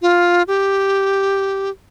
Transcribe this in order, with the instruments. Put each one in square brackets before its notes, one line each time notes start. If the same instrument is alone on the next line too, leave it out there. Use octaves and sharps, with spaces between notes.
[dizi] F4
G4